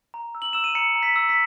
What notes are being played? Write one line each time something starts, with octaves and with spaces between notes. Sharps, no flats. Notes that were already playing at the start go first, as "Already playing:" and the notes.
A#5
E6
F#7
E6 E7
D#7
A#5 C#7
A#5
B6
E6
B6